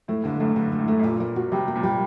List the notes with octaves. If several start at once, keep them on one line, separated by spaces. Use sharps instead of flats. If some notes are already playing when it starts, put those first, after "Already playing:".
A2 A3
G2 D3
F#2 A3
G2 D3
A3
A2
A3
F#2
G2 A#2
A#3
F#4
C3 G3
A#3
A#2
G3